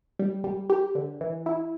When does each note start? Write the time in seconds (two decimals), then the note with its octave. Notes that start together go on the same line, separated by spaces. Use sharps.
0.19 G3
0.44 G3
0.70 G4
0.95 D3
1.21 E3
1.46 E4